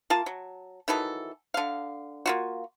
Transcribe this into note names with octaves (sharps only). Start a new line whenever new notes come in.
A#3 F4 A5
F#3
D#3 E3 F#3 A4
D3 F5
A#3 F4 F#4